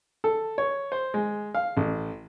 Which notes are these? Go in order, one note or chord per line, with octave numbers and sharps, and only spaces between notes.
A4
C#5
C5
G#3
F5
A1